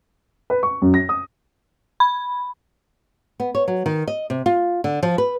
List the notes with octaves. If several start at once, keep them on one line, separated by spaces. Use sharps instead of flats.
B4
C#6
F#2
A#6
D#6
B5
B3
C#5
F#3
D#3
D#5
C3
F4
D3
F3
B4